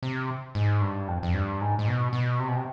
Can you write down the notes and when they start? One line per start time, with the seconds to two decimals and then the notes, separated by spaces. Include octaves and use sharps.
0.03 C3
0.55 G#2
0.81 G2
1.08 F2
1.23 F2
1.34 G2
1.61 G#2
1.79 G#2
1.87 B2
2.13 B2
2.39 C3
2.48 B2
2.56 C3